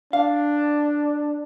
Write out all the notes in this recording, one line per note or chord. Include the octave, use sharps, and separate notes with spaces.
D4 F5